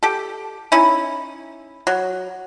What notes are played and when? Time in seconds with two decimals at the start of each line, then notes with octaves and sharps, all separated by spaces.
0.03 G4 A4
0.72 C#4 D#4 E4
1.87 F#3